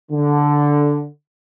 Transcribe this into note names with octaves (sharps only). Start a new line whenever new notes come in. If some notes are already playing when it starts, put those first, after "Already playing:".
D3